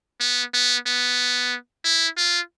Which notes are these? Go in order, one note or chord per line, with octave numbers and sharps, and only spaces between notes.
B3
B3
B3
E4
F4